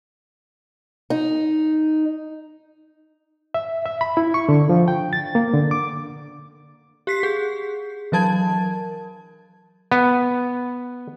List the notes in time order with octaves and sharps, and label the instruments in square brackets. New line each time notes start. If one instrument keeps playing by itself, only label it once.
[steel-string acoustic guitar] D#4
[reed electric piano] E5
E5
B5
E4
C#6
D3
F3
G5
A6
A#3
D3
D6
[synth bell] G4 B6 C7
G#4
E3 F#3 A#4 A5 G#6
[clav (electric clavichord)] B3